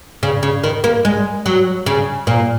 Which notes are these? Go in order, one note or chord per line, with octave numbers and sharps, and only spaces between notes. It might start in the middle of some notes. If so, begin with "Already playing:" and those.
C#3
C#3
D#3
A#3
G#3
F#3
C#3
A#2